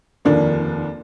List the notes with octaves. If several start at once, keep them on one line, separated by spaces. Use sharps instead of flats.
F1 D#2 D3 F3 A#3 D4